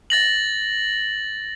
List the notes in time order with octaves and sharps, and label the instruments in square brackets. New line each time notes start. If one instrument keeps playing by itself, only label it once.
[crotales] A6 A#6 F#7